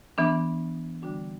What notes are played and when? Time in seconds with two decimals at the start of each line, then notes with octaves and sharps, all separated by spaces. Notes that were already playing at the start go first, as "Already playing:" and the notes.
0.18 E3 B3 D4
1.02 D3 G3 D4 F#4